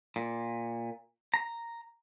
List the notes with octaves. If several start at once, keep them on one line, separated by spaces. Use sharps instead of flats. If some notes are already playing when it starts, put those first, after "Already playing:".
A#2
A#5